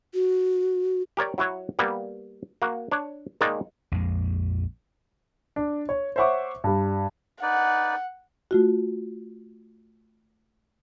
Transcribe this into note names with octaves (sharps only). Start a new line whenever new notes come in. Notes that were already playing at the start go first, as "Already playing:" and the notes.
F#4
G4 A#4 C#5 D5
F#3 E4 F#4 C#5
G3 A#3 B3
A#3 F#4
D4 C#5
D#3 G#3 A#3 D#4 D5
A#1 F2 G#3
D4
C#5
C5 C#5 E5 F#5 C#6 D6
G2 G3
D#4 B4 D5 F#5
A3 F4 F#4